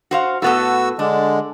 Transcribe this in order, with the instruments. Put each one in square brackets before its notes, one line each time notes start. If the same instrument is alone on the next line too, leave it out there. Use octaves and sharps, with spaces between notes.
[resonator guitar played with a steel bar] F#4 C5 F5
[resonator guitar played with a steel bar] A2 B3 A4 [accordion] F#4 E6
[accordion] D3 G#3 [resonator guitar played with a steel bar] D4